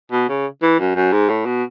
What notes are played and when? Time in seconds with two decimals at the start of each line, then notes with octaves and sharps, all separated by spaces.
0.12 B2
0.28 C#3
0.62 E3
0.79 F#2
0.96 F#2
1.12 G#2
1.29 A2
1.45 B2